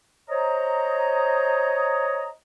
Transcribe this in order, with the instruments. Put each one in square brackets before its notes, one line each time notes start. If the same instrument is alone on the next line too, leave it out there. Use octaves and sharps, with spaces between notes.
[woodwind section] C5 C#5 D#5 A#5